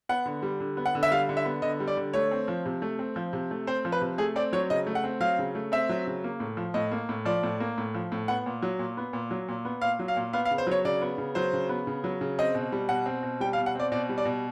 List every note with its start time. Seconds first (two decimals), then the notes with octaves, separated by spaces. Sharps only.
0.09 B3 F#5
0.26 D3
0.42 G3
0.60 D3
0.77 B3
0.86 F#5
0.95 D3
1.03 E5
1.11 G3 F5
1.29 D3
1.37 E5
1.45 B3
1.62 D3 D#5
1.80 G3
1.88 D5
1.97 D3
2.13 A3 C#5
2.31 C4
2.48 F3
2.66 C3
2.82 A3
2.99 C4
3.16 F3
3.33 C3
3.51 A3
3.67 C4 C5
3.85 F3
3.92 B4
4.01 C3
4.18 A3 G#4
4.36 C4 D5
4.53 F#3 C#5
4.70 C#3 D#5
4.87 A3
4.95 F#5
5.04 C4
5.20 F#3 F5
5.39 C#3
5.55 A3
5.72 C4 E5
5.89 F#3
6.07 C#3
6.24 A#3
6.40 A2
6.57 F3
6.74 A2 D#5
6.92 A#3
7.09 A2
7.25 F3 D5
7.43 A2
7.60 A#3
7.78 A2
7.95 F3
8.12 A2
8.28 B3 F#5
8.46 A#2
8.62 F#3
8.79 A#2
8.97 B3
9.13 A#2
9.31 F#3
9.48 A#2
9.65 B3
9.81 A#2 F5
9.99 F#3
10.08 F5
10.16 A#2
10.33 B3 F5
10.45 F5
10.51 C#3
10.58 C5
10.67 F#3 C#5
10.85 C#3 D5
11.02 B3
11.18 C#3
11.35 F#3 C5
11.53 C#3
11.69 B3
11.87 C#3
12.04 F#3
12.21 C#3
12.39 C4 D#5
12.55 B2
12.72 G3
12.89 B2 F#5
13.06 C4
13.23 B2
13.40 G3 G5
13.53 F5
13.58 B2
13.66 F#5
13.75 C4 D5
13.92 B2 D5
14.09 G3
14.18 D5
14.25 B2